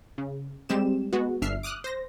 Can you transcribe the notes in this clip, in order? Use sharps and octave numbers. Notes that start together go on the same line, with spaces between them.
C#3
G3 G#3 C4 G4 E7
G#3 B3 F#4
G1 D4 E5 F6 C7
D6 D#6 F6 F#6
C5 A#6